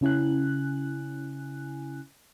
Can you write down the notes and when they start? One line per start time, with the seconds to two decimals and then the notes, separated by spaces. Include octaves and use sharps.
0.01 C#3 C#4 E4 G#5 F#6